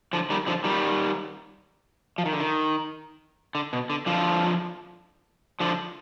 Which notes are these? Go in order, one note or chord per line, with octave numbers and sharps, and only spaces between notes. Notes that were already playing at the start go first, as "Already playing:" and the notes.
D3 F3
D#3 G3
D3 F3
D#3 G3
F3
D#3
D3
D#3
D3
B2
D3
D3 F3
D3 F3